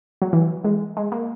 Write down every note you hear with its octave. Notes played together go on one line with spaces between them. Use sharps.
F#3
E3
G#3
G#3
A#3